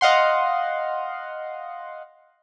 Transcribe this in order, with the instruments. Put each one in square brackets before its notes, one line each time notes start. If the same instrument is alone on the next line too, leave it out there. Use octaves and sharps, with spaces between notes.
[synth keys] D#5 F5 F#5 C6